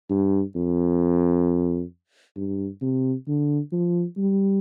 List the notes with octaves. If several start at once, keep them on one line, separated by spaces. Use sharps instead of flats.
G2
F2
G2
C3
D3
F3
G3